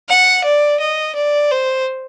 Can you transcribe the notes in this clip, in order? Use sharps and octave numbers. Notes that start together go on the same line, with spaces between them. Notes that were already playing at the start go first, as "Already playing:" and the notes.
F#5
D5
D#5
D5
C5